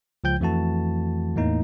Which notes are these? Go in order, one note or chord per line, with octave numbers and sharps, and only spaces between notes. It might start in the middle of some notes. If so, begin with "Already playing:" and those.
C#2 F3 G5 G6
F2 E3 A3 F#4 A5
E2 A2 A#3 D#4